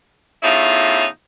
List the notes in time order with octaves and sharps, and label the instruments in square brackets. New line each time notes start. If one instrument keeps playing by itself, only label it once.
[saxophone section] E2 A2 C#4 D#4 F4 E5